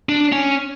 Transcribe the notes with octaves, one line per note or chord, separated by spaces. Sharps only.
D4
C#4